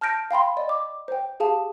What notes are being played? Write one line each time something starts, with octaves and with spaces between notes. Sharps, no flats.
A5 F6 G6 A#6 D7
F5 G5 B5 C6
D5 D#5
D6
C5 G5
G4 G#4 F5 A5